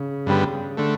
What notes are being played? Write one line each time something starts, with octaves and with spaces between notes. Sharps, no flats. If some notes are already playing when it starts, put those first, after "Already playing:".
Already playing: C#3
G2 D3 G3 B3
D3 A3